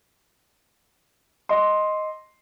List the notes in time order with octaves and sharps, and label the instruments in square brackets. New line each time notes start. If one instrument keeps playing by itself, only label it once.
[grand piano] D#5 C6